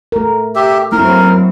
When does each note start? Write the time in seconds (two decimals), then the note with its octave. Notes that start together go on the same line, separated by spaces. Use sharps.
0.12 A3 A#4
0.55 G4 E5
0.92 F#2 F#3 A3 A#3 C4 E4 A#4